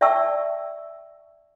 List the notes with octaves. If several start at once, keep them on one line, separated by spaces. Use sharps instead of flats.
D5 E5 G5 A5 C#6 E6